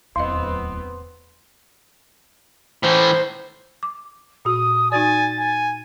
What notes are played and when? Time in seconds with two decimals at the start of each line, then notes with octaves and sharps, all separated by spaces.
0.16 D1 E2 B3 C4 E4 D#5 C6
2.83 A2 E3 C5
3.83 D6
4.45 A#2 F#4 D#6
4.92 D#4 F#4 D5 G#5 A6
5.39 G#5